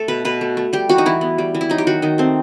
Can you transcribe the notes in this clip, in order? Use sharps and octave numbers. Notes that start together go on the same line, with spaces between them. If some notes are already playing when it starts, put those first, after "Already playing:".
Already playing: A3 A4
B2 B4
B2 B4
A3
A3
G3 G4
E3 F#4
D#4
E3 E4
B3
G3
E3
E4
F#3 D#4
G4
D#3 F#4
D#3 D#4
A3 C4